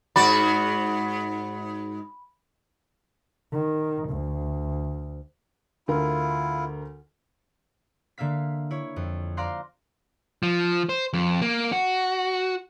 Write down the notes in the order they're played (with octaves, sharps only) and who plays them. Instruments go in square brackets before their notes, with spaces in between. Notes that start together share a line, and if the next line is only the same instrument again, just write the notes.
[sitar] G#2 F#4 D5 [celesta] B5
[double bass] D#3
D2
[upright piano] D2 A#4 [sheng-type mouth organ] E4 F4
[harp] D3 A#3 E5 F5 B6
E4 C#5
F2
C5 D5 F5 A#5 C6 F#6
[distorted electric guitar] F3
C5
F2
A#3
F#4